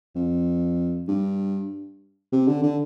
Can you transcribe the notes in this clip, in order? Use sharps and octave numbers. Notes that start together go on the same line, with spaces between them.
F2
G2
C3
D3
D3